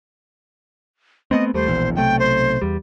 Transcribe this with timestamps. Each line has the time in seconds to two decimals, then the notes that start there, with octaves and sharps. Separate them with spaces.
1.31 A3 B3 C4 D#5
1.54 D#2 G3 A3 C5
1.67 E1 A#1 E2
1.95 B1 C3 A3 G5
2.19 C5
2.62 E2 G3